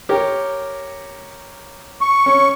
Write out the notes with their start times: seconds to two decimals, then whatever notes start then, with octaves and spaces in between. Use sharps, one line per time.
0.09 G4 A#4 C#5
2.01 C#6
2.26 C#4